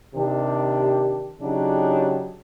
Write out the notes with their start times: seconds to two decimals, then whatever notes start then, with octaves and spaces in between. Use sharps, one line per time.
0.15 C3 D#3 D4 G4
1.41 C#3 F#3 D4 D#4 G4